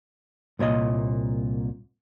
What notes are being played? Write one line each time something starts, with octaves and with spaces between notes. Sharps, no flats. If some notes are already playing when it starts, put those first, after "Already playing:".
C2 A#2 C#5 D#5